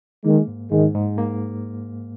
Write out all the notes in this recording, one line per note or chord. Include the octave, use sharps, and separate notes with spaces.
D#3 G#3 A#3
G#2
G#2 D#3 G#3
G#2
A#3